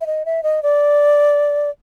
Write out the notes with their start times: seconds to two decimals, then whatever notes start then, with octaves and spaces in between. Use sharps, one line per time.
0.01 E5
0.06 D#5
0.25 E5
0.43 D#5
0.63 D5